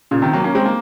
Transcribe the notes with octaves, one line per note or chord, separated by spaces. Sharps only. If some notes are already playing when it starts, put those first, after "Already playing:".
A#2 C#3
C3 D#3
F#3 A#3
A#3 C#4
G#3 C4
A#3